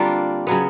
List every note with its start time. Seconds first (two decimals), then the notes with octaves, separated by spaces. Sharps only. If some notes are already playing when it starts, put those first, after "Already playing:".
Already playing: D3 G3 A#3 C4 D4 F4
0.47 C#3 F#3 B3